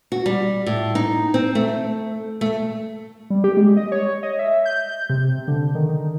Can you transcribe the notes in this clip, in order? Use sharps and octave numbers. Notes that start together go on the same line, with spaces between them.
F#4
G3
A2
D#4
C4
A3
A3
G3
G4
G#3
D#5
C#5
D#5
E5
G6
C3
D3
D#3
D#3